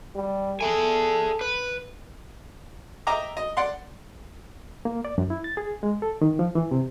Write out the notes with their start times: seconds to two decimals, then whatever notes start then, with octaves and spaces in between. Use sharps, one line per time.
0.15 G3
0.61 G#4 A4 E5 G#5
1.41 B4
3.07 D#5 E5 G5 A#5 D6
3.37 D#5
3.57 D5 F#5 C6
4.85 A#3
5.05 D5
5.18 F#2
5.30 E4
5.44 A6
5.57 G#4
5.83 G#3
6.02 A4
6.22 D#3
6.39 F3
6.55 E3
6.71 C3